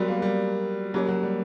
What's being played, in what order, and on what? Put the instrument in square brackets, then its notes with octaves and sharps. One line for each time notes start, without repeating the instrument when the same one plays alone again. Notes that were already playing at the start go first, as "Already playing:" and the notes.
Already playing: [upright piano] F#3 G3 [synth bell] B3 F#4 A#4 D5
[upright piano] A#3
G3
[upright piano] F#3 [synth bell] A#3 C#4 G4 A#4 C#5
[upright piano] F#3
G3